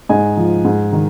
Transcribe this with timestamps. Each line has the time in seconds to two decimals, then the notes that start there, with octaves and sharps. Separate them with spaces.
0.09 G#2 D#5 G#5
0.37 F3
0.65 G#2
0.92 D#3